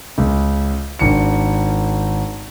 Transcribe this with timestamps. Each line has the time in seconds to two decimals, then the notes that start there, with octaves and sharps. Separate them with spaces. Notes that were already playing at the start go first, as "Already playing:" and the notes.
0.18 C#2
0.99 G#1 D4 C#7